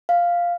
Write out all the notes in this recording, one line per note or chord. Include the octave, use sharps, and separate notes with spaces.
F5